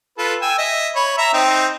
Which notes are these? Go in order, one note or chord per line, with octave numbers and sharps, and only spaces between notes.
F4 A4 B4
G5 G#5 E6
D#5 E5
C#5 B5
E5 A#5 E6
C4 D#4 G5